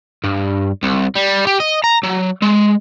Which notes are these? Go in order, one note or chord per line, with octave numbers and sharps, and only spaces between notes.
G2
C2
G3
G4
D#5
A#5
F#3
G#3